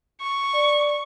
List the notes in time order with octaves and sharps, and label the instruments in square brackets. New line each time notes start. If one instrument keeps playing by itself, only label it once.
[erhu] C#6
[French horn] D5